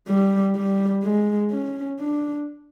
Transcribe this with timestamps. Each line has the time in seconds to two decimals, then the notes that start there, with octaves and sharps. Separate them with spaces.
0.08 G3
0.56 G3
1.04 G#3
1.51 C#4
2.00 D4